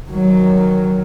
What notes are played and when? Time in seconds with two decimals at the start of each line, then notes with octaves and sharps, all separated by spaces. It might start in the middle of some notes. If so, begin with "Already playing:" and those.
0.10 D#3 F#3